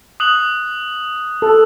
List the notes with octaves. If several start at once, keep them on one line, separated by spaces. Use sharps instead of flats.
D#6 F#6 F#7
A4